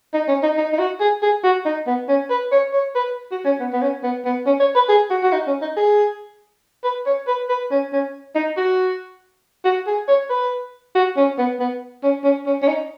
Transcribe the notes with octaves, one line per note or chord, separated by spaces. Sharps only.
D#4
C#4
D#4
D#4
D#4
F#4
G#4
G#4
F#4
D#4
B3
C#4
B4
C#5
C#5
B4
F#4
C#4
B3
B3
C#4
B3
B3
C#4
C#5
B4
G#4
F#4
F#4
D#4
C#4
D#4
G#4
B4
C#5
B4
B4
C#4
C#4
D#4
F#4
F#4
G#4
C#5
B4
F#4
C#4
B3
B3
C#4
C#4
C#4
C#4
D#4